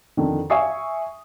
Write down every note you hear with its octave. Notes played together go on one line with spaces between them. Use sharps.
F2 D3 D#3
E5 G#5 C#6 D#6 C7